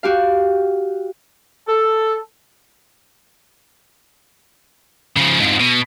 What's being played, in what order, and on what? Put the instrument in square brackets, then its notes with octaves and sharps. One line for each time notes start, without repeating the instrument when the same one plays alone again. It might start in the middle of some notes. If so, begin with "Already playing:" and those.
[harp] F#4 G4 F5
[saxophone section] A4
[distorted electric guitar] C#3 F3
F2 G#2
B2